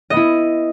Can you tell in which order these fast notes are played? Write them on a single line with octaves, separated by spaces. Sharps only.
D#5 B3 E4